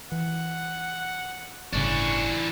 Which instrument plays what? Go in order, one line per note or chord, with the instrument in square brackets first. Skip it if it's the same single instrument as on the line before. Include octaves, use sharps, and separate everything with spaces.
[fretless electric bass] E3 [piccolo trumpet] F#5
[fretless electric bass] G1 A2 C#3 [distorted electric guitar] E3 D4 [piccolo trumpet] C#6